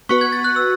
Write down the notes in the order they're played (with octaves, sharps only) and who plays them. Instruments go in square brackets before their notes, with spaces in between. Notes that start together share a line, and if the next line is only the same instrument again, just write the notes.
[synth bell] B3 F#4 B4 [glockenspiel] C#6
[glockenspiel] G#6
A6
F#6
E6